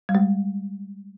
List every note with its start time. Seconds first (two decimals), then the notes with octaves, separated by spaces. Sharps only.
0.09 G3
0.15 G#3